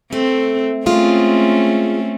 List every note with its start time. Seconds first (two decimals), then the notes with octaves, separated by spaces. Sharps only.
0.12 A3 C4
0.86 G#3 A3 C4 C#4 F4